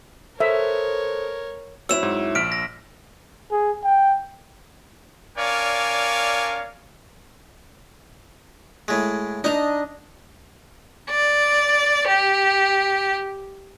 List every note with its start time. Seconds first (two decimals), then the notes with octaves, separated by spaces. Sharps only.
0.40 A4 A#4 C5 C#5 E5
1.89 F#3 C4 E4 E6 E7
2.03 G#2
2.35 A#1 F6 B6 D7
2.52 A#6
3.52 G#4
3.84 G5
5.38 D4 A#4 C#5 D5 F5 G#5
8.88 A2 G#3
9.44 D4 D#4 D#5 A#5
11.10 D5
12.07 G4